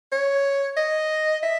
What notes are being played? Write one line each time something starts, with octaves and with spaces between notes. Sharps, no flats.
C#5
D#5
E5